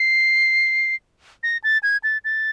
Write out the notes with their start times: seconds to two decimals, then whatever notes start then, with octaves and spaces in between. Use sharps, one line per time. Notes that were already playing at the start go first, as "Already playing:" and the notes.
Already playing: C7
1.43 A#6
1.64 A6
1.83 G#6
2.04 A6
2.25 A6